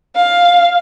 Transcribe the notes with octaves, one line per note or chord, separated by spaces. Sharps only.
F5